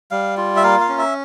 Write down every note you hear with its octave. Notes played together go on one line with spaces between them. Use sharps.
G3 F5
F4
E5
A#3 F5
F5
C#4
E5